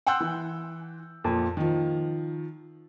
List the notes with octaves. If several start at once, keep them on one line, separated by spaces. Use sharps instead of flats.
F#5 G5 C6 E6 F#6 G6
E3
F2 A#2 F3
D#3 F3